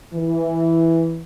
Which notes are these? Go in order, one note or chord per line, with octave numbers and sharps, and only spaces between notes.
E3